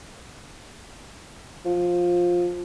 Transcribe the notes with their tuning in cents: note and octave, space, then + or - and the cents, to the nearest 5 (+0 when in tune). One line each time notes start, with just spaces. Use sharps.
F3 +10